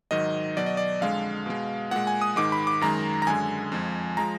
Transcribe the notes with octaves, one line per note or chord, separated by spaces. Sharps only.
G#2 D#3 F#3 D#5
B2 F#3 D5
D#5
D5
F2 D3 G#3 F5
B2 G#3
A#2 G#3 F#5
G#5
D#6
G#2 D#3 G#3 D6
B5
D6
F#2 D#3 G#3 A#5
A#5
F#2 D3 G#3 G#5
F2 F3 G#3
F3 G#3 A#5